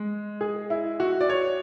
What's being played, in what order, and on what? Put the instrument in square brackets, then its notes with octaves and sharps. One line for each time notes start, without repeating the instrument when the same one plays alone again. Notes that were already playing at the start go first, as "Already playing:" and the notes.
Already playing: [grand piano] G#3
G#4
E4
F#4
D5
C#5